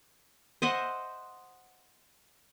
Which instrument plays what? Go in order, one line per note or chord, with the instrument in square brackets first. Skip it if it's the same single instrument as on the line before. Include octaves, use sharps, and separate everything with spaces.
[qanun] C5 D#5 E5 F#5